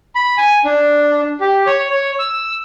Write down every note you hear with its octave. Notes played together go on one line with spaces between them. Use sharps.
B5
G#5
D4
G4
C#5
C#5
E6